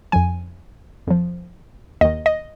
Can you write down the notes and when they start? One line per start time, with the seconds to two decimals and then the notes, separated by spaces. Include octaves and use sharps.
0.12 F2 F3 G#5
1.07 F2 F3
2.01 D#2 D#3 D#5
2.26 D#5